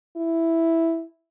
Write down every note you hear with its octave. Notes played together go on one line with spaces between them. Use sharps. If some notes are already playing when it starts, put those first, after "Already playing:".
E4